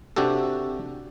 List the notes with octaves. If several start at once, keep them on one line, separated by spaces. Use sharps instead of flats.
C3 D4 F#4 G4 A4